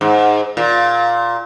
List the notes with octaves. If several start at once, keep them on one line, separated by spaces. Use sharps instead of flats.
G#2
A#2